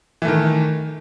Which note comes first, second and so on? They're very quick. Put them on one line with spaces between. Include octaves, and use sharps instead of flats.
E3 A3 D#3